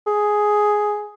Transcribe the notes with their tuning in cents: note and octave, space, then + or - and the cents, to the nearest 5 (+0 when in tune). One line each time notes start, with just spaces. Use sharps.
G#4 +5